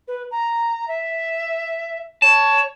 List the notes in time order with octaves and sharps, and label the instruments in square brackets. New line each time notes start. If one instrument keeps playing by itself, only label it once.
[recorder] B4
A#5
E5
[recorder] C#5 [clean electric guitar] A5